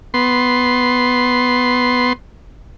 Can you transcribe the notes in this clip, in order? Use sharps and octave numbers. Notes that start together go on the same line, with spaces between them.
B3 C6